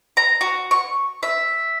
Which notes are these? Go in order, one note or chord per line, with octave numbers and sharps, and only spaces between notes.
A#5
F#4
C#6
E5